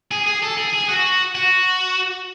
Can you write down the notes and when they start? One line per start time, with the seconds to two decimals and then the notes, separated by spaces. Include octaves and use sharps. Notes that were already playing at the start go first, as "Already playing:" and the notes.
0.11 G#4
0.27 G#4
0.43 A4
0.58 G#4
0.74 G#4
0.89 F#4
1.35 F#4